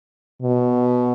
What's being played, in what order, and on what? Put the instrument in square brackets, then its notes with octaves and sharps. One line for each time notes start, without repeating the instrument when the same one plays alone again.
[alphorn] B2